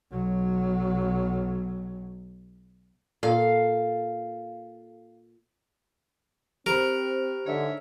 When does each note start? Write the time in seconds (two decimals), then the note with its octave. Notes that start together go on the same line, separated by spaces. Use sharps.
0.11 B1 F#3
3.23 A#2 A4 F5
6.66 C4 G4 A#4 C5 B5
7.46 G#2 D3 C#5 E5